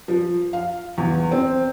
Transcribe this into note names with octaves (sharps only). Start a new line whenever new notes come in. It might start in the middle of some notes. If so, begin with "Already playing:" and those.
F3
F5
E2
C4